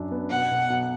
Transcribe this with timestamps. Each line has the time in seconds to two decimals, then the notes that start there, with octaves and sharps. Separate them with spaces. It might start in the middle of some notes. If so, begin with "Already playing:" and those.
Already playing: F#2 F#3 D4
0.12 B3
0.30 B2 F#5
0.51 B1
0.70 B1